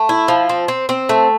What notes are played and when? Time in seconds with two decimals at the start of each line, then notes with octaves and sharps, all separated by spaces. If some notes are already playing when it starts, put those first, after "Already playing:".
Already playing: A3
0.09 E4
0.28 F3
0.49 C4
0.68 C4
0.89 C4
1.09 A3